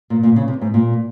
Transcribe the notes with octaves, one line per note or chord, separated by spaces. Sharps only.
A#2
A#2
C#3
C3
G#2
A#2